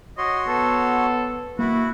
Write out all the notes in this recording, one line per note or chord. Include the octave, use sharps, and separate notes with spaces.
F#4 C#5 D#5 C6
B3 A4
A#3 E4 F#4